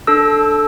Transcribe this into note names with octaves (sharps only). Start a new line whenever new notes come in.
D4 A4 E6